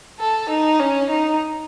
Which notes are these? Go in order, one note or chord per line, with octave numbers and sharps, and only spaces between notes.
A4
D#4
C#4
D#4